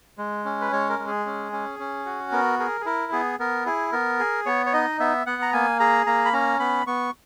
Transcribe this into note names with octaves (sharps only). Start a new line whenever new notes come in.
G#3
C#4
B4
G#3 C#5
A#4
G#3
G#4
C#4
C#4
C#4
F#4
B3 A#4
G#4 A#4
G#4
E4 A#4
B3 G#4
B3 A#4
E4 G#4
B3 A#4
G#4
B3 C#5
C#5
D#4 D#5
B3 E5
B3 F#5
A#5
A#3 G#5
G#4 A#5
A#3 A#5
B5
C#4 A#5
B3 B5
B3 C#6